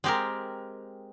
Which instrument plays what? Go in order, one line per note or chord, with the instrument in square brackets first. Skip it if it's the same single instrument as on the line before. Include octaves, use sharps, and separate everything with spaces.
[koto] G#3 C4 G4 A#4